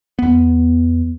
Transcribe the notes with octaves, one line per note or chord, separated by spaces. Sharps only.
E2 B3